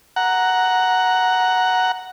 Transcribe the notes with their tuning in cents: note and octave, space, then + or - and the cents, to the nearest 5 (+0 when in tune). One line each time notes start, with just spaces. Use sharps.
F#5 +0 A#5 +0